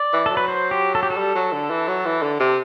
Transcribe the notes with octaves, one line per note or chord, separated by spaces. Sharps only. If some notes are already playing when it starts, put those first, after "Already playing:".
Already playing: D5
E3
F#3 A4
B4
C5
G4
A4
G4
A4
G3
F#3
D3
E3
F#3
E3
D3
C3